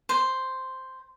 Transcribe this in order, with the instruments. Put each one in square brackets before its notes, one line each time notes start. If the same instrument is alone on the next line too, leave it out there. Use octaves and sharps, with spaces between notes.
[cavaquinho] C5